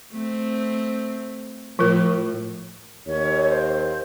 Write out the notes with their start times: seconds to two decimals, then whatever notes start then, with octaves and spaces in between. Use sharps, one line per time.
0.12 A3 C4
1.79 A2 F3 F4 A#4
3.07 D#2 C#5
3.49 C5